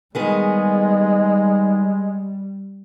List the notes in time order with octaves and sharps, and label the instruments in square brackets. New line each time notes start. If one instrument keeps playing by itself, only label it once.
[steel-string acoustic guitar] D#3 B3 G#4 [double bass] G3 [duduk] G#3